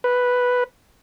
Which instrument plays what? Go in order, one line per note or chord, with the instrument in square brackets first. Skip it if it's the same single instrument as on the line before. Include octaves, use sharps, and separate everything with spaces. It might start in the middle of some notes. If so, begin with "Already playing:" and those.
[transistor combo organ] B4